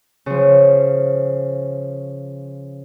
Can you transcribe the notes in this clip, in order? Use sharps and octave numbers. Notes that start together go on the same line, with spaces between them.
C#3 F3